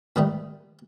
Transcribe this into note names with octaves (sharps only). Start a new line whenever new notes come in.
G#2 D#3 G3 A3